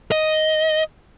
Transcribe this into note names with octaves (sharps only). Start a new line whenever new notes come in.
D#5